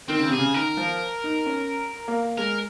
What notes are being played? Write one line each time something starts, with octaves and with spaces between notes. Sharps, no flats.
D#3 C4
C#3
C3 G#4
C#3
D#3 A#4
F3
D#4
C#4
A#3
G#3 A#4